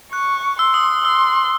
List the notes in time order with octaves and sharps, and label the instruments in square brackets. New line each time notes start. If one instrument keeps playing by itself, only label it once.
[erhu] C#6 [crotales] F#6
[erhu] C6 [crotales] E6
[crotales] D#6
[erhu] C6 [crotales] E6